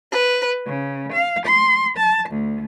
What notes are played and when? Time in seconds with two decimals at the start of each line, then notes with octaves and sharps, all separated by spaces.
0.12 B4
0.65 C#3
1.11 F5
1.46 C6
1.97 A5
2.30 D2